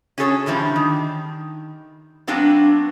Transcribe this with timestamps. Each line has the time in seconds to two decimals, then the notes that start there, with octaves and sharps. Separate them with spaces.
0.18 C#4 F#4 G#4 A4 C5 C#5
0.46 D3 E3 F3 G3
0.76 D#3
2.27 F#3 B3 C4 D4 F#4 F5